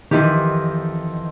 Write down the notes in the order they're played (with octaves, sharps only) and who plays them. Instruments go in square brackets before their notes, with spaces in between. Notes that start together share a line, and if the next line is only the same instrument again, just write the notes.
[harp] F2 E3 G4 [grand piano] D#3 D#4